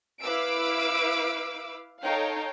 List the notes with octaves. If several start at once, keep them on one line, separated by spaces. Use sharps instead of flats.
E4 B4 F5 D6 E6 D7
D#4 A4 C#5 F5 G5